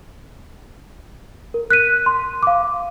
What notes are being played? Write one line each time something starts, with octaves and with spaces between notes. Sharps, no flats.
A#4
F#6 B6 D#7
C6
F5 D6